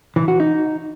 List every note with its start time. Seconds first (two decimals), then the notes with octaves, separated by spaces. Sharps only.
0.16 E3
0.28 F#4
0.40 D#4